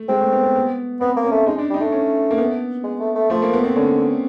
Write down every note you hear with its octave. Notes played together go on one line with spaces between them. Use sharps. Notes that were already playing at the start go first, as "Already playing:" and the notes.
Already playing: A3
G#3 C4
A3
B3
B3
B3
B3 C4
A#3
C#4
A3
G#3 D#4
D4
G3
D#4
A3 D4
C#4
A#3
B3
G#3
A3
A3
F3 A3
A#3
B3
C4
D3 C#4